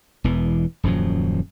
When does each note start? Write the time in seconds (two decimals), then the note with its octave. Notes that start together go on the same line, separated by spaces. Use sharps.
0.24 E1 E2 E3
0.83 D#1 F#2 F3 F#3